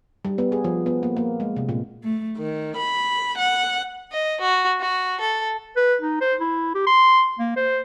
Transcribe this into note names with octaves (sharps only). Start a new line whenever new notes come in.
G3
B3
G#4
F3
B3
A#3
A#3
G#3
C3
A#2
A3
D#3
B5
F#5
D#5
F#4
F#4
A4
B4
D#4
C5
E4
G4
C6
A#3
C5